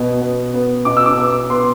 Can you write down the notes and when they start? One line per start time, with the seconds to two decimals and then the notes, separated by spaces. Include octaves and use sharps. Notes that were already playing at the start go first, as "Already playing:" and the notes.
Already playing: B2 B3
0.21 B3
0.54 B3
0.85 B2 D6
0.97 E6
1.06 D6
1.18 B3
1.50 B3 C6